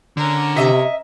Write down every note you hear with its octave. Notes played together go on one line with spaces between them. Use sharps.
D3 C#4 A#4
C3 D#5 E5